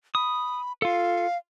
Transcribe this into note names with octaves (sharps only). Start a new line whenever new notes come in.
B5 D#6
F4 A4 F5